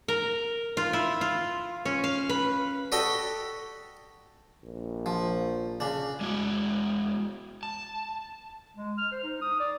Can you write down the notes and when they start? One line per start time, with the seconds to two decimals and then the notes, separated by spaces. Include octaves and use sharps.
0.08 A#4
0.77 F4
0.93 E4
1.21 F4
1.85 C#4
2.04 F5
2.29 B4
2.92 F#4 G4 A4 D5 D#5 G5
4.63 A#1
5.06 F3
5.80 C#3 D4
6.21 G#3 B3 F#4
7.63 A5
8.76 G#3
8.98 F6
9.12 C5
9.24 D#4
9.42 D#6
9.60 D5